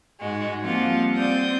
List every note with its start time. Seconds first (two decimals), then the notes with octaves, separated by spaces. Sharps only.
0.20 G#2 G#3 F#4
0.61 F3 G3 A#3 C4 F4 F#5
1.13 C4 D5 D#6 G6